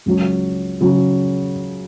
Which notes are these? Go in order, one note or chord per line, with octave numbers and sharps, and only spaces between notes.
C#2 C#3 F#3
C#3 F#3